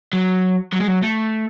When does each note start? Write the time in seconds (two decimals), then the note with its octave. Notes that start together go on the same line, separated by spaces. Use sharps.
0.13 F#3
0.72 F#3
0.80 G#3
0.87 F#3
1.02 A3